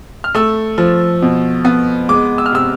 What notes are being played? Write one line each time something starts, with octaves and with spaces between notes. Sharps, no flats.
F6
A3 E6
F3
B2
B3
G#3 D6
E6
F6
C3 E6